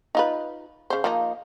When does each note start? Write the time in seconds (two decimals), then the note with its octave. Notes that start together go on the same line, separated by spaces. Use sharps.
0.15 D#4 F4 B4
0.90 C#3 C5
1.04 F3 A#3 D#4